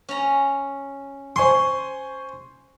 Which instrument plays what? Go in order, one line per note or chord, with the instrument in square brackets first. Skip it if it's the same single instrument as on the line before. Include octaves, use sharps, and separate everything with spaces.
[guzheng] C#4 A#5
[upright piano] C5 G#5 C#6 [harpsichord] C6